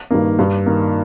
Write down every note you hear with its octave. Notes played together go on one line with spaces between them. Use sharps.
G2 D#3 A#3
G2
D#3 A#3